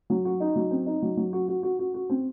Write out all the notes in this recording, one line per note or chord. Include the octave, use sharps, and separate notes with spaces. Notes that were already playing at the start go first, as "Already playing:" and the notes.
F#3
F#4
D#4
F#3
C4
D#4
F#3
F#3
F#4
F#4
F#4
F#4
F#4
C4